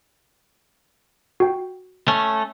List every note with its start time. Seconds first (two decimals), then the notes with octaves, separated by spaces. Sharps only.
1.40 F#4 G5
2.08 A3 C#4